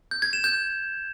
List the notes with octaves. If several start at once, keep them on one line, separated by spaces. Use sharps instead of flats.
G6
G#6
E7
G6